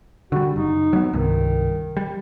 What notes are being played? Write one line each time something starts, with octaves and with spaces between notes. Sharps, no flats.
D3 G3 F#4
F#1 D#4
F#3 B3
C2 G2 D#3
G3